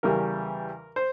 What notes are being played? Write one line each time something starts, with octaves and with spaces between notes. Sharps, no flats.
E2 C#3 E3 G3 A#4
C5